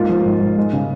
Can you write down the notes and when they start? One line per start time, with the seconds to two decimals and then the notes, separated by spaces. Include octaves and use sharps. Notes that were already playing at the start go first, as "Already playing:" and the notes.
Already playing: G#2 A#3 F4
0.09 F3
0.25 G#2
0.41 G#2
0.58 G#3
0.73 C#3